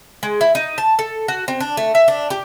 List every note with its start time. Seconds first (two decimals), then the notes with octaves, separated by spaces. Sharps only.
0.23 G#3
0.41 E4
0.55 D#4
0.78 A5
0.99 A4
1.28 F#4
1.48 C4
1.60 D4
1.77 A3
1.95 E5
2.08 D4
2.30 G4